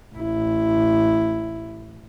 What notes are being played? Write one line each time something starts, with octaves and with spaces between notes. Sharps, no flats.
A1 E4